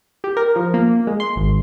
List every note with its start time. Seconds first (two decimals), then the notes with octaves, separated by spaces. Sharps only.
0.24 G4
0.37 A#4
0.56 F3
0.74 A#3
1.07 G#3
1.20 C6
1.36 G#1